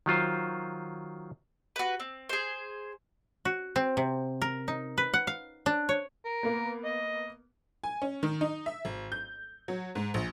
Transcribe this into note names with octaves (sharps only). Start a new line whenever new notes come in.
D#3 F#3 F4 C5
F#4 B4
C4
G#4 C5
F#4
C4
C3
A#4
D#4
B4
F#5
F5
D4
C#5
A#4
A#3 B3
D#5
G#5
C#4
D#3
D#4
E5
G#1
G6
F#3
G#2
A#1